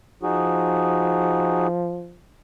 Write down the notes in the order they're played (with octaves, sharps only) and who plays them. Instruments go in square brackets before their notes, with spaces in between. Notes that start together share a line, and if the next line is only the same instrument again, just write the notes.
[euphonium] F3 [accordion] D#4 F#4 G#4